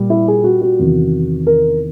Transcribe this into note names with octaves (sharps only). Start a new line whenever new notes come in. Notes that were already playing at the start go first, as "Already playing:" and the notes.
Already playing: A#2 G3
E4
G#4
F#4
F#4
E2 C3 D#3
A#4